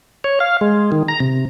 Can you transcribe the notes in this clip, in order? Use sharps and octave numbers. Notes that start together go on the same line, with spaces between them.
C#5
F5
G#3
D#3
A#5
C3